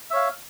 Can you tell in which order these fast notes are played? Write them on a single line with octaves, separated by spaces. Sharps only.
E5 C#5 F5